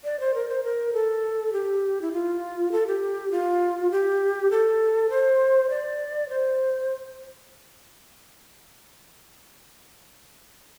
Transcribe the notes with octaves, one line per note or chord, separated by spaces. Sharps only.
D5
C5
A#4
C5
A#4
A4
G4
E4
F4
A4
G4
F4
G4
A4
C5
D5
C5